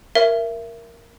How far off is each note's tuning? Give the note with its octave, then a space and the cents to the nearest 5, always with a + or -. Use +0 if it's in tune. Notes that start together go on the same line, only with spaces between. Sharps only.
A#4 +0 C#5 +0 E5 +25